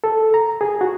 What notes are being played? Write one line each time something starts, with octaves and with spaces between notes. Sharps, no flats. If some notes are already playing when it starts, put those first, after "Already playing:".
A4
A#5
G#4
F#4